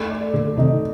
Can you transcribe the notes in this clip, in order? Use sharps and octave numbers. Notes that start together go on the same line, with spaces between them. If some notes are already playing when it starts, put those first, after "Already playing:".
Already playing: A3
D5
A#2 D3 A4
C3 D#3 D#4